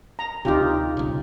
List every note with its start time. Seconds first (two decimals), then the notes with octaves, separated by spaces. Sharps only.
0.19 A#5
0.45 D2 C3 D#4 F4 G4
0.97 B1 C#3